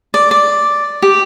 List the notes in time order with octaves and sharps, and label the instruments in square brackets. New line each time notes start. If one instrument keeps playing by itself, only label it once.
[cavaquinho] D5
D5
G4